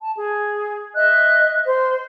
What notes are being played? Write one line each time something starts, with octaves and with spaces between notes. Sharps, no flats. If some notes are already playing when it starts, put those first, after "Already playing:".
A5
G#4
D#5 E5 F#6
C5